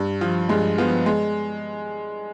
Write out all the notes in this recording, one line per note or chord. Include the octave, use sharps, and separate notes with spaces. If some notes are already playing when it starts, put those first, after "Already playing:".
Already playing: G2
F3
G2 G#3
F3 B3
G#3